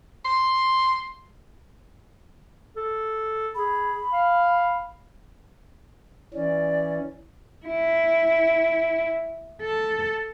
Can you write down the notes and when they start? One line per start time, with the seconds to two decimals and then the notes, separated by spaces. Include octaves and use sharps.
0.25 C6
2.76 A4
3.55 G#4 B5
4.13 F5
6.33 E3 C#4 D5
7.66 E4
9.62 A4